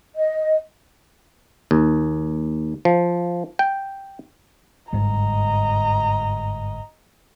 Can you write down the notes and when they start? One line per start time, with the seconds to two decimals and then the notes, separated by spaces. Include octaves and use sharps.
0.15 D#5
1.71 D#2
2.85 F3
3.59 G5
4.93 G1 G#2 G3 D#5 A#5